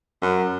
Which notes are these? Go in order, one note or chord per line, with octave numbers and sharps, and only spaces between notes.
F#2